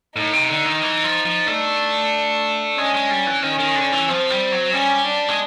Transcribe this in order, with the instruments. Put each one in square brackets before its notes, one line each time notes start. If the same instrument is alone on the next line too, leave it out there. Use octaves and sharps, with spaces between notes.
[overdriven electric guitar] A2 [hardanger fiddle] D#4
[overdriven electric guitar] C3
D3
D#3
E3
F3
F3
[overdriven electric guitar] A3 [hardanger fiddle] D4
[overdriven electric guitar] G#3 [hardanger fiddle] C#4
[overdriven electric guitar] G#3
G3
E3
[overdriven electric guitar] D#3 [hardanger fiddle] C#4
[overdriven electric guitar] D#3
D3
E3
[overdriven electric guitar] F3 [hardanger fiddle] C4
[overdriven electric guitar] G3
F#3
[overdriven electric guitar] G3 [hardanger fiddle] C#4
[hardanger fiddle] D4
[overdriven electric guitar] G#3